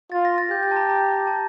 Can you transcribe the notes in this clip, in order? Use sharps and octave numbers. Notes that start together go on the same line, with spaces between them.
F4 A6
A#6
A6
G4 G6
G6
A5
A#5
A#5
A5